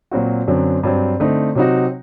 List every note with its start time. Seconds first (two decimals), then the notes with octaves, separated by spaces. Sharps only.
0.11 A#2 F#3 C4 F#4
0.47 F#2 D3 F#3 C4
0.83 G2 F#3 C4
1.20 D3 A3 C4 D#4
1.55 C3 F#3 C4 D#4 F#4